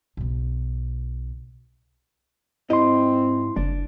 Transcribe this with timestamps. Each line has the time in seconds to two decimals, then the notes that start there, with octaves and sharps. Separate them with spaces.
0.17 B1 B2
2.70 G#2 C4 E4 G4 D#5 C6
3.57 F#1 D4